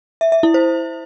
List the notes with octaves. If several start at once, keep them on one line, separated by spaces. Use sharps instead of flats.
E5
E5
E4
C5